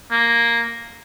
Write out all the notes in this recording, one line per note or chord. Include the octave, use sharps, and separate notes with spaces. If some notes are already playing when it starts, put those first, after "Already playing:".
A#3